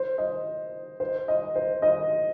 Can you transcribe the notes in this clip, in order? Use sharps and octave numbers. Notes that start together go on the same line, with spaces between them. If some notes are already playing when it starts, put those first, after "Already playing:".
Already playing: C5
D#5
C5
D#5
C5
D#5